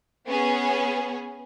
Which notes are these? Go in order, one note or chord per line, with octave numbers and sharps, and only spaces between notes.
B3 C#4 G#4